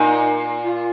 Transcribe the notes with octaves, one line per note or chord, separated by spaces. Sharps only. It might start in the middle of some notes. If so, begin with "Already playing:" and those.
Already playing: A#2 D#4
F4